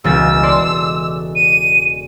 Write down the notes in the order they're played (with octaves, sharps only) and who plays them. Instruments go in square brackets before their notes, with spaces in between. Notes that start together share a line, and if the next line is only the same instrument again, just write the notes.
[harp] E1 C#2 A6 [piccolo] E6
[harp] A4 D5 C6
[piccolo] D#7